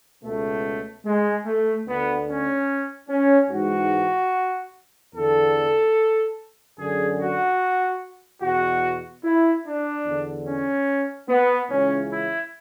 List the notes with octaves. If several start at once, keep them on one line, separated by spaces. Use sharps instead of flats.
C#2 B2 A3
G#3
A3
D2 D3 B3
C#4
C#4
G#2 E3 F#4
E2 D3 A4
F#2 D3 G#4
F#4
E2 B2 F#4
E4
D4
E2 D3
C#4
B3
C#2 C#3 E3 C#4
E4